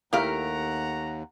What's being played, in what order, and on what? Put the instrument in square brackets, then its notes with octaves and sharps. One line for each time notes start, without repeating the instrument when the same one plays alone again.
[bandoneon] D#2 [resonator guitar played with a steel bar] A3 A#4 [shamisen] E4 G4 F5 [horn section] F#5 A#5